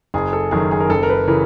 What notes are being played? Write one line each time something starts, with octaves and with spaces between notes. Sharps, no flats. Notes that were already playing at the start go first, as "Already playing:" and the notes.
F#1 G#4
A4
F#2 D#3 G#4
G#4
A#4
F#1 A4
A#4
B4
C#3 E3 A#4